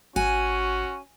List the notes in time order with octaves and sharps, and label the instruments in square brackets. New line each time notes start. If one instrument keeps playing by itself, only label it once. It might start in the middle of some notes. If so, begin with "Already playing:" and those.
[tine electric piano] G#1 [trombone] C#4 [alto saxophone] F#4 [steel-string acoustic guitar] G#5